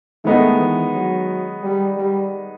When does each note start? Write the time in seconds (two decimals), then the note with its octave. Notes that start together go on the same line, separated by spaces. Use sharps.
0.24 D#3 G#3 A3 B3 D#4
0.58 E3
0.94 F#3
1.63 G3
1.97 G3